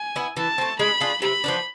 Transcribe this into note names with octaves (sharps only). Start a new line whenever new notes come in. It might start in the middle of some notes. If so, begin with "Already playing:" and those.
Already playing: G#5
B3 E4
E3 A5
A3 C4
G#3 B5
D4 F4 G#4
C3 B5
F3 B3 D4